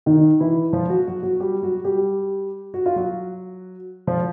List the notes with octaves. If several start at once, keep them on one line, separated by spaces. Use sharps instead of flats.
D#3 D#4
E3 E4
F3 F4
F#3 F#4
F#3 F#4
F#3 F#4
G3 G4
F#3 F#4
G3 G4
F#4
F4
F#3 F#4
F3 F4